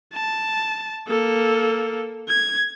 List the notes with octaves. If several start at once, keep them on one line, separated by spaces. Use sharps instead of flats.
A5
A#3 A4
G#6